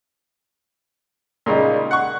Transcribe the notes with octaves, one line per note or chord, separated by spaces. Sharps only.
A#2 C#3 G3 D#4
F#5 C#6